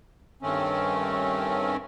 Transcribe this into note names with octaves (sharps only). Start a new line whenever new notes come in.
G2 D#3 A3 C4 C#4